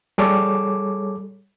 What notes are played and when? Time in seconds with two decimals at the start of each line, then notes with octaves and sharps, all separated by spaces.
0.18 G3 G#4 A4 C#5 D6